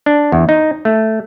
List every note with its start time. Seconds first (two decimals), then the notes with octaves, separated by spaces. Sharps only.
0.06 D4
0.32 E2
0.49 D#4
0.85 A3